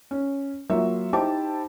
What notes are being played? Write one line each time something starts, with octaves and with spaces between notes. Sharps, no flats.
C#4
F#3 A#3 F4 F#4 E5
D#4 E4 G4 C5 A5 D6